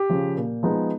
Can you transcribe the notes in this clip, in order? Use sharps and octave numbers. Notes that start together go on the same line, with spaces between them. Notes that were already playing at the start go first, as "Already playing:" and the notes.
Already playing: G4
C#3 F3
A#2
F3 G#3 B3 D#4